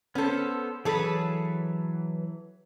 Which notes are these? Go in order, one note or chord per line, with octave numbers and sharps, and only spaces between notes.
B3 C#4 A4 C5
E3 F#3 G#4 A4 B4 B5